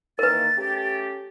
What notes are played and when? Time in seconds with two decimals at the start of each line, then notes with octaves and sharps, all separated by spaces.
0.19 D#3 E3 A#3 A#4 B4 A6
0.57 A3 C#4 G4